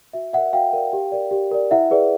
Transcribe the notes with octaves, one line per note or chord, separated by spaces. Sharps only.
F#4 E5
A#4 D5 E5 F#5
F#4 F5 G5
A#4 D5
G4
A#4 D5
G4
A#4 D5
E4 E5 F#5
G#4 B4 D5